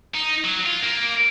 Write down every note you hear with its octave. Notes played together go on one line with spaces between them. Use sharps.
D#4
F#3
F4
A#3